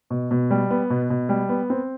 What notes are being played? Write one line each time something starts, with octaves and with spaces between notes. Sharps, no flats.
B2
B2
G3
B3
B2
B2
G3
B3
C4